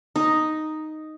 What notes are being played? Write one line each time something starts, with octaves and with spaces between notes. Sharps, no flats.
D#4